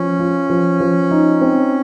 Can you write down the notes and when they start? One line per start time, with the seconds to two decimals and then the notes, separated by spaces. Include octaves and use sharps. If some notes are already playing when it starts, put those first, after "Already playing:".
Already playing: F3 C#4
0.19 F4
0.50 F3
0.80 F3
1.11 D#4
1.41 C4